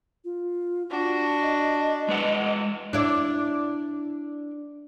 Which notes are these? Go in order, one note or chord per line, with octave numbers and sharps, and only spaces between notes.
F4
D4 F4 F#4
D#5
G#3 B4 F#5
D4 E4 D5